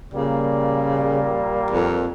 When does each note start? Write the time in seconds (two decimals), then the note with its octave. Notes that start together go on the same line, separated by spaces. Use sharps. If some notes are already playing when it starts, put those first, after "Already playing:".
0.14 A#2 C#3 G3 A#3
1.70 F2